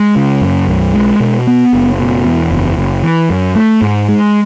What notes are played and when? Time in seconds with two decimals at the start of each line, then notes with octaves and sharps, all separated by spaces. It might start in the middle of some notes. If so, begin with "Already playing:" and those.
Already playing: G#3
0.16 C#3
0.42 F#2
0.69 B1
0.94 G#3
1.20 B2
1.47 B3
1.73 F#1
1.99 B2
2.24 E2
2.51 F#1
2.77 F#1
3.03 E3
3.30 F#2
3.55 A3
3.82 G#2
4.09 G#3